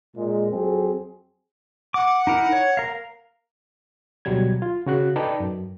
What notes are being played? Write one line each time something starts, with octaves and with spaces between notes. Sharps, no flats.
A#2 G#3
F2 F#3 C4 G#4
F#5 D6
D#4 E4 A#4
C#5
A#4 F5
D2 B2 F#3 G3 G#6
F4
C#3 F#4 F#6
D#4 A4 B4 D5 G5 A5
F#2